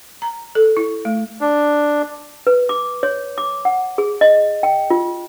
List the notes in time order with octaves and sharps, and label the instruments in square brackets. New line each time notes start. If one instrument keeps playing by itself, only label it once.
[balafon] A#5
A4
E4
A3
[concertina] D4
[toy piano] B4
D6
C#5
D6
F#5
G#4
D#5
G5
F4